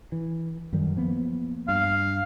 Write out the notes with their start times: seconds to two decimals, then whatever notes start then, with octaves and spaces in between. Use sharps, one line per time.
0.12 E3
0.73 F#2 D#3 G3
0.97 F3 A#3 B3
1.68 G2 F5